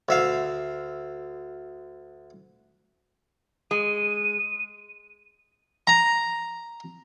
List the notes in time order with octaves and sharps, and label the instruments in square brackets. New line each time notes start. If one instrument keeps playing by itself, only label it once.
[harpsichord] D2 E5 F5
[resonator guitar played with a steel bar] G#3 [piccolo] D#7
[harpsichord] A#5